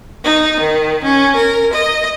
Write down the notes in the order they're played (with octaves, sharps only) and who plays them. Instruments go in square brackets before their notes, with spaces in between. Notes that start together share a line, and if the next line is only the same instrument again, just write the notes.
[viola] D#4
D#3
C#4
A#4
D#5